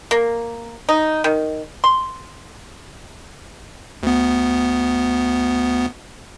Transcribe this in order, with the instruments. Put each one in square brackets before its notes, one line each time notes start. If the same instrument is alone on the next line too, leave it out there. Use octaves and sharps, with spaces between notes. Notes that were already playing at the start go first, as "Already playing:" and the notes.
[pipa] A#3
D#4
D#3
C6
[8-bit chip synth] D2 B3